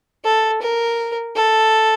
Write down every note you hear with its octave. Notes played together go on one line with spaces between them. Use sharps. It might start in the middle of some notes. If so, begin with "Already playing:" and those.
A4
A#4
A4